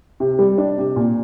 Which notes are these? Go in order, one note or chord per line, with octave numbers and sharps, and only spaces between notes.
C3
G3
D4
C3
A#2